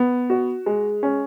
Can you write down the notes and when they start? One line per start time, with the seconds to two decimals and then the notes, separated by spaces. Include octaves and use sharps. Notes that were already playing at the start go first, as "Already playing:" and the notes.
Already playing: B3
0.30 F#4
0.66 G#3
1.03 C#4